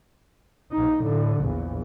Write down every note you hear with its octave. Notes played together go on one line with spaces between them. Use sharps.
A#1 D#4
A2 D3
A#1 E2